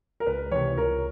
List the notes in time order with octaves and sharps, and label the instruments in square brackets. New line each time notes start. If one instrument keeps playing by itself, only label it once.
[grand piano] A#4
[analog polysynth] C#2 [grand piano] B4
[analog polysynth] C3 E3 [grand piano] C#5
[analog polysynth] C#2 [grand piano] A#4